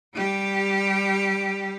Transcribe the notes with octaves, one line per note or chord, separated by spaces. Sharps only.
G3 G4